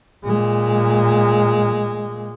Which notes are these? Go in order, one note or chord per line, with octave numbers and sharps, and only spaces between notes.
A#2 G#3